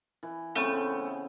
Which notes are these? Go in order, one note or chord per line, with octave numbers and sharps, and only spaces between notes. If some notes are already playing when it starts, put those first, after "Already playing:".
E3
C#3 A3 B3 C4